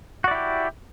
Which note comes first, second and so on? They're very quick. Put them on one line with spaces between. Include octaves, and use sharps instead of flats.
F#4 D5 E4 G4